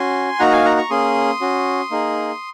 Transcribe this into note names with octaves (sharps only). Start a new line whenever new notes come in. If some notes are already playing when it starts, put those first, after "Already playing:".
Already playing: C#4 F#4 G#5 C6
A#3 D#4 F#4 F#5 A#5
F5 G#5
F#5 A#5
A#5 C#6
A#3 C#4 G#4 C6 D#6
C#4 F#4
A#3 D#4 G#4